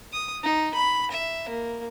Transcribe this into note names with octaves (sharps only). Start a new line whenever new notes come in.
D#6
D#4
B5
E5
A#3